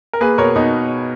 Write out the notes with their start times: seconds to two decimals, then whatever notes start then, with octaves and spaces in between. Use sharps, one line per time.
0.13 A#4
0.21 A#3 G#4 B4
0.38 B2 A#4 C#5
0.56 B2 D#4